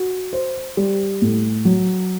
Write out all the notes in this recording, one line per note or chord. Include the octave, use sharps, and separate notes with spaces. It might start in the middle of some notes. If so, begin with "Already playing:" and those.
Already playing: F#4
C5
G3
A2
F#3